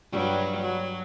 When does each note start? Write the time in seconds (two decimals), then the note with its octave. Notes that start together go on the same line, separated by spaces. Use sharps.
0.11 G2 F#3 G3
0.61 F#3